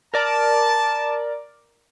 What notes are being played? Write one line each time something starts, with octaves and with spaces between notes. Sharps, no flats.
A#4 D5 A5